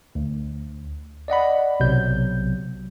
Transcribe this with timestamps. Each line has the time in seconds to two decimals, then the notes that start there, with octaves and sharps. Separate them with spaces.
0.15 D2
1.28 D5 D#5 F#5 B5
1.80 B1 C3 F#3 G6